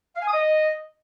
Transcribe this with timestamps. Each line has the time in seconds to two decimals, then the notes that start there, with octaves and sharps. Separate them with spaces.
0.16 F5
0.22 G#5
0.28 D#6
0.33 D#5